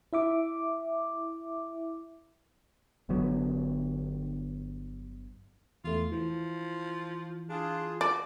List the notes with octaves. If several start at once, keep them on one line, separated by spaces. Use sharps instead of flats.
E4 E5 D6
G1 D3 F#3 B3
E2 A3 F4
E3 F3
D4 F4 G#4
F#4 D5